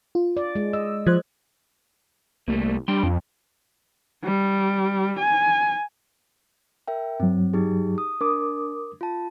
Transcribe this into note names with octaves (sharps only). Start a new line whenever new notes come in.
F4
D5
G#3
D#5 E6
F3 C5 F#6 G#6
C2 G3 A3 A#3
G3 D4 G5 C6
F2
G3
G#5
A#4 E5 G5
G2 F#3 C4
D#4 G4 G#4
D#6
D4 A#4 D6 D#6
F4 A5